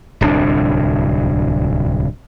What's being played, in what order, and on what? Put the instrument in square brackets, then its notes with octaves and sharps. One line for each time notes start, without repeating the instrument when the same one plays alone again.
[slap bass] D1 C2 F2 D4